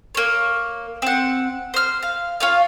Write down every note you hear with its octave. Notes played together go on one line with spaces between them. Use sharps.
A#3 C#5
C4 F#5
C5 F6
F5
F4 C#5 F5